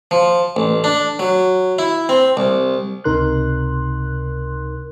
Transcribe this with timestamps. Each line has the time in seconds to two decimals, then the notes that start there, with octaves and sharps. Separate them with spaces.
0.11 F3
0.56 A1
0.84 D4
1.19 F#3
1.79 E4
2.09 C4
2.37 C2
3.04 C#2 C3 D#4 A#4 C6 F#6